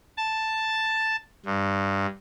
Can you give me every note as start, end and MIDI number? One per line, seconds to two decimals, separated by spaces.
0.17 1.16 81
1.46 2.06 43